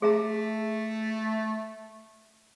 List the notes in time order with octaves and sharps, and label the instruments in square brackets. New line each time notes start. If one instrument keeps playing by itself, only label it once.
[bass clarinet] A3 [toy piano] G#4 E5 A#5